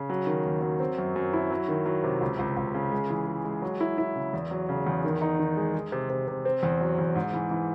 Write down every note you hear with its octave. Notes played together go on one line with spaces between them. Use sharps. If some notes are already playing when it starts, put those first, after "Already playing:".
Already playing: C#3
F#3
D#3
D#2
F#3
C4
F#2
F#2
E4
F#3
D#3
F#3
C3
C#2
C#2
C#2
C#3
G#3
E3
G#3
G#3
F#3
E4
E4
C#3
E2
F#3
C#3
E2
D#3
D#4
D#3
G#3
G#3
C3
C3
C3
C4
E2
F#3
E2
G#2
E3
E3